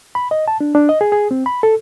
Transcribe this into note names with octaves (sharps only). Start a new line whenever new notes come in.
B5
D#5
A5
D4
D4
D#5
G#4
G#4
C4
B5
A4